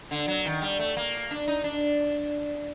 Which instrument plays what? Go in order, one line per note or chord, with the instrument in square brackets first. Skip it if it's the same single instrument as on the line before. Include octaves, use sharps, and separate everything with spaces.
[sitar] D3
F#3
D#3
G3
A3
A#3
D4
D#4
D4